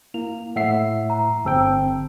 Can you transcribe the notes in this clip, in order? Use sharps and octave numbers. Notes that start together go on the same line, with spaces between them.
A#3 E4 F7
A2 E5 F#5 C7
A#5
G1 C4 G5 A5 E6